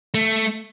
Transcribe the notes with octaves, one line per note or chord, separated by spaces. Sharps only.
A3